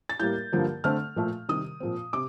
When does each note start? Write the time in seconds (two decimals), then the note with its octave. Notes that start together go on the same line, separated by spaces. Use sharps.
0.09 A6
0.20 A2 G3 A#3 G6
0.52 G2 D3 F3 A#3
0.84 D3 A3 C4 F6
1.16 A#2 F3 A3
1.49 C3 D#3 G3 D#6
1.80 A#2 F3 C4
2.13 C3 D6